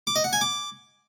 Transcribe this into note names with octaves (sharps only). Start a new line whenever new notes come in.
D6
D#5
F#5
G#5
D6